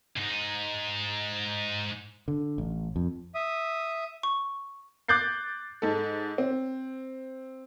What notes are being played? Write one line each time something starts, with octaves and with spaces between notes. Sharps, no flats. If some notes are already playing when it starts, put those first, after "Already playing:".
G#2 D#4
D3
A1
F2
E5 D#6
C#6
D6 F#6 G6 A6 C7
G#2 A4
C4